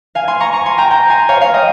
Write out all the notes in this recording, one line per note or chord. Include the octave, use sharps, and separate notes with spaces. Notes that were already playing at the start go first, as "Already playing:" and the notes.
F5 G#5
G#5 C6
A#5 C#6
A#5 C#6
G#5 C6
G5 A#5
G5 A#5
G#5 C6
C#5 F5
C#5 F5
D#5 G5